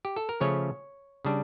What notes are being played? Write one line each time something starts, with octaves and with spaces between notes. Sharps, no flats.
G4
A4
A#4
C#3 F3 A3 C#4 C#5
C#3 G3 D4